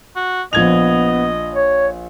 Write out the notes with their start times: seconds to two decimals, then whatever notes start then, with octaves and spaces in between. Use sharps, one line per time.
0.16 F#4
0.53 A#1 B3 D#5 G#6 F7
1.53 C#5